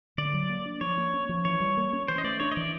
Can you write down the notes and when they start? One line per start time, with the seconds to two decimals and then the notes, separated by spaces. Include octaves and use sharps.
0.18 D3 D5
0.34 F#3
0.49 A#3
0.65 D4
0.81 F3 C#5
0.98 A#3
1.13 C#4
1.29 F3
1.45 E3 C#5
1.60 G3
1.77 A#3
1.93 C#4
2.08 E3 C5
2.18 D#5
2.24 A3 D5
2.40 D4 C#5
2.52 D#5
2.56 E3 D5